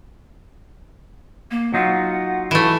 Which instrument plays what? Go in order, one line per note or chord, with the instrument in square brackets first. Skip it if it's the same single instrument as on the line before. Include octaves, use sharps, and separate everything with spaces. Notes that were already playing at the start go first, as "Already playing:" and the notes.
[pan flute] A#3
[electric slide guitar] F#3 D#4 F4 [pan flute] F#5
[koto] E3 A3 [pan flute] E4